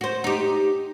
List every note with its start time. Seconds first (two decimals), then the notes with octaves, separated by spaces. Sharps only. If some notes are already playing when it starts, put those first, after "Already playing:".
0.01 F#4 C5
0.24 D#4 G4